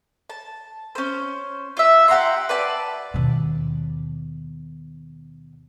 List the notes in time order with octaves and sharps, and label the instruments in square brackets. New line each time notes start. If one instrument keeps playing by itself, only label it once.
[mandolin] A5
C#4 C5
F4 E5
G4 F#5 A#5 C6
B4 D5 A5
[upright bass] D#2 B2